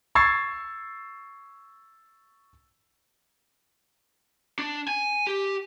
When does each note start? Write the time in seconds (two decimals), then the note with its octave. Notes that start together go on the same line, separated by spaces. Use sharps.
0.15 C#6 E6 G#6 A6 C7
4.59 D4
4.88 G#5
5.27 G4